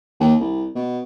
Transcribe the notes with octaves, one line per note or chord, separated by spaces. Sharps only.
D#2
C2
B2